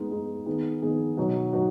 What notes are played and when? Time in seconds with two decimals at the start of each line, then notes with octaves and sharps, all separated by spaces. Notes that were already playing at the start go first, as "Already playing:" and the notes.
Already playing: G#3 B3 D#4
0.11 G#3 B3 D#4
0.46 D#3 B3 D#4 G#4
0.82 D#3 B3 D#4 G#4
1.17 B2 F#3 D#4 F#4
1.53 F#3 D#4 F#4